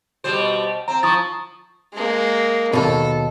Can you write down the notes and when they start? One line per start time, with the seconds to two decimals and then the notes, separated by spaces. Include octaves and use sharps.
0.24 B2 G3 C5
0.88 C4 A#5
1.03 F3 C#6 D#6 A6
1.94 G#3 A#3
2.73 D#2 B2 A4